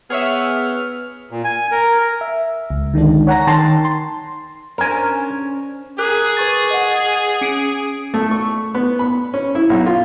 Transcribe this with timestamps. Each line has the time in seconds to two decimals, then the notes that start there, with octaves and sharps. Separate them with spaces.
0.10 B3 G#4 C#5 E5 F6
1.31 A#2
1.44 G#5
1.71 A#4
2.21 E5
2.70 C#2
2.93 D3 D#3 G#3 D4
3.27 C#5 F#5 G#5 A#5 A#6
3.47 D#3 G5 A5 A#5 C6 A6
3.84 C6
4.78 C#4 D4 A#4 C5 G#5
5.99 G#4 A#4 D6 F#6
6.37 B4 C#6 A6
6.71 D#5 F#5
7.41 C#4 C#7 D7
8.14 A3
8.31 C#6
8.75 B3
8.99 B5
9.34 C#4
9.55 E4
9.70 B1
9.86 F4